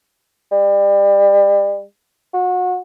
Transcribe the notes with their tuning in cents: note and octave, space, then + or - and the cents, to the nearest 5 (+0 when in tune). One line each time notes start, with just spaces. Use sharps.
G3 +30
F#4 -30